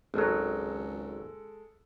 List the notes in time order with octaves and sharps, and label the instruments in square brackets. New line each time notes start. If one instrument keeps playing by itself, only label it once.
[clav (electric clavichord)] G#1 F#3 [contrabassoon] C#2 [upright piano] G#3 A4